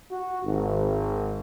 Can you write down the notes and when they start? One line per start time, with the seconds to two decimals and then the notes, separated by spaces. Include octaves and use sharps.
0.11 F#4
0.43 G#1